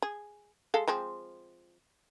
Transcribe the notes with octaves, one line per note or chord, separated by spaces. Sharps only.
G#4
G#3 A4 F5
F3 G#3 C4